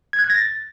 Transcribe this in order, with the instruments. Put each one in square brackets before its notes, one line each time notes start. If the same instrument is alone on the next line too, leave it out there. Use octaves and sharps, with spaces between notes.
[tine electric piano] G#6
F#6
G#6
A#6
A6